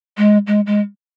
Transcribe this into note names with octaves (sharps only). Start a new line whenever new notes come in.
G#3
G#3
G#3